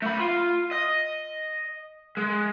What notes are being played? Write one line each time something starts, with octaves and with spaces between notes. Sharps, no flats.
A3 B5
F4
D#5
G#3